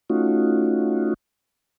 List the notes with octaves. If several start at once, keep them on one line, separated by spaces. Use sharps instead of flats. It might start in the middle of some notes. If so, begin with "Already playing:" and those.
A3 C#4 D#4 F4 F#4